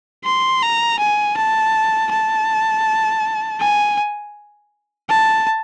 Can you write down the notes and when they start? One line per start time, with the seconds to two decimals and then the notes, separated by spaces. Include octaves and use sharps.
0.24 C6
0.62 A#5
0.99 G#5
1.36 A5
2.11 A5
3.60 G#5
5.09 A5